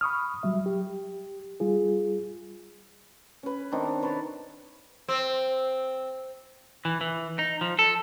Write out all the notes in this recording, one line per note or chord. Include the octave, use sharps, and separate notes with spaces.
B5 C#6 D#6 F6
F#3 G3 E5
G4
G3 F4 G#4
C#4 B4
D#3 C4 D4
A#5
B4 C#5 A5 C6
C4
E3
E3
D#4
F3
A4